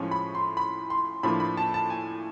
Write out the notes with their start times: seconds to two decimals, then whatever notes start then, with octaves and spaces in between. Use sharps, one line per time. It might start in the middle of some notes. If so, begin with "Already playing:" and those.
Already playing: A2 F3 G#3 C#4 C#6
0.11 B5
0.35 C6
0.57 B5
0.90 C6
1.23 A2 F3 A#3 D4 B5
1.40 B5
1.57 A5
1.74 A5
1.90 G#5